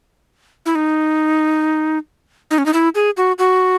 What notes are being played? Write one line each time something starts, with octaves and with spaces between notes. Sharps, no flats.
E4
D#4
D#4
C#4
D#4
E4
G#4
F#4
F#4